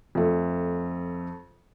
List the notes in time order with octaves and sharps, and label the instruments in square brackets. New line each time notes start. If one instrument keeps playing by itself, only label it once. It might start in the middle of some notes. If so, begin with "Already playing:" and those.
[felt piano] F2 A3